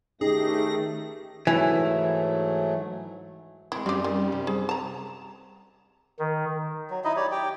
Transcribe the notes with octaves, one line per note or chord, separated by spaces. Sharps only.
D#3 A3 C#4 D#4 G4 G#4 A#6
G#2 E3 F#3 A3
G#3 C4 E4
F#2 G3 F#4 C5 D5 A#5
D#3
C3
G#4
A5 A#5
D#3
F#3
D#4 E4 D#5
G4 C#5 D5
G4 G5